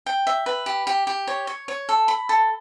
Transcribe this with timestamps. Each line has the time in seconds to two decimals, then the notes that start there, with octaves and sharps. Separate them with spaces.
0.06 G5
0.27 E5
0.46 B4
0.66 G4
0.87 G4
1.07 G4
1.27 C#5
1.47 C#5
1.68 C#5
1.89 A4
2.08 B5
2.29 A4